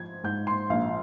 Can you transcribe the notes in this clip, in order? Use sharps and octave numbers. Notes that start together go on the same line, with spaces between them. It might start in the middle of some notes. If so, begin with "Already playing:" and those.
Already playing: G#2 F3 G#6
G#2 G6
C6
A#1 F5